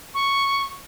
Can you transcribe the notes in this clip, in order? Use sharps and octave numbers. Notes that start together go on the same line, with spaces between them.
C#6